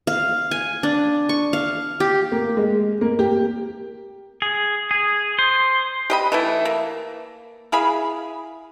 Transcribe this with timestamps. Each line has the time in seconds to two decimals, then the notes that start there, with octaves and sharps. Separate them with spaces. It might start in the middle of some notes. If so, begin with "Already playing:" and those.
0.07 F5
0.51 G#5
0.83 D4
1.29 C#6
1.53 F5
2.00 G4
2.32 A#3
2.57 G#3
3.01 A#3
3.19 G4
4.42 G#4
4.91 G#4
5.39 C5
6.10 G4 D#5 B5
6.32 E3 A3 E4
6.65 A#3
7.72 E4 G#4 F5 B5